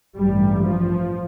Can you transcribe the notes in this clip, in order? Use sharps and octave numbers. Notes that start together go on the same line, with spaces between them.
A1 G2 G3
F3